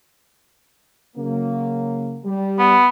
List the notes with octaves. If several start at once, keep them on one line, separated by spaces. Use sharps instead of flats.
C#3 F#3 A#3
G3
B3